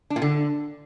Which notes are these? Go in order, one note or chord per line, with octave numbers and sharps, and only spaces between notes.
D4
A#2
D3